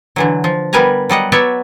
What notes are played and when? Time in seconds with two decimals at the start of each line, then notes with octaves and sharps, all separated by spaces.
0.16 D3 E3 F#3
0.44 F3
0.73 G3 B3 A#4 B4 G#5 A#5
1.09 F#3 G3 D#5 F#5
1.32 F#3 B3 F#4 C#5 D5 E5